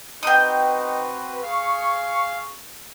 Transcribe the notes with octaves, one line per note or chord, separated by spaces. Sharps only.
C4 D#4 F#4 B4 G5 D#6
G#4 F5 C#6